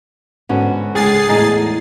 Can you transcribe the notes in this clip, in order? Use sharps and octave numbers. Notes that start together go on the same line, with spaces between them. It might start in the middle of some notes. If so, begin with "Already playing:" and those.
G#2 D3 B3 C#4 F#4
C#2 G#3 G#4 A6 C7
E2 A2 G#3 D#4 D#5 A#5